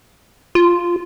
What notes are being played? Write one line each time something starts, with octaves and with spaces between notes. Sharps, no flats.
F4